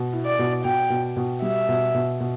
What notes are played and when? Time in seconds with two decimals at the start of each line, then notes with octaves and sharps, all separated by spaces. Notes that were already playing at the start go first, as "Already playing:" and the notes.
Already playing: B2
0.13 E4
0.26 D5
0.39 B2
0.65 B2 G5
0.90 B2
1.17 B2
1.42 G3 E5
1.69 B2
1.94 B2
2.20 B2